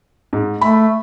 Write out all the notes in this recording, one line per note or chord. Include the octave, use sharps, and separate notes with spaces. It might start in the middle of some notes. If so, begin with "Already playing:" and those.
G#2
A3 B5